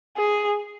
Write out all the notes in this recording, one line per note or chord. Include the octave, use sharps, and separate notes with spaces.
G#4